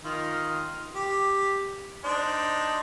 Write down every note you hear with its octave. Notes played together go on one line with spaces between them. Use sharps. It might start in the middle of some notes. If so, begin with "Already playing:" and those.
D#3 F4 D#5
G4
D4 D#4 C5